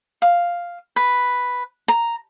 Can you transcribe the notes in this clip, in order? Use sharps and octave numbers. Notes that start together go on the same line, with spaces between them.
F5
B4
A#5